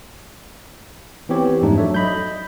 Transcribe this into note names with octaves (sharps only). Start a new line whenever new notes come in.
E3 B3 C4 G4 C#5
F2 G#2 A3 D4 D#4
F#3 A4 C#5 D5 E5
D#5 B5 G6